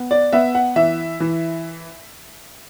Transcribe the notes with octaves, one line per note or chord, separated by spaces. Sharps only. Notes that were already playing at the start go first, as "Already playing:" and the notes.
Already playing: B3
D5
B3 E5
F#5
E3 E5
E3